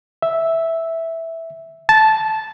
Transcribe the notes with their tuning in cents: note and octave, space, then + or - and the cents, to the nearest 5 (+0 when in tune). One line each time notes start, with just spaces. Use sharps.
E5 -5
A5 -10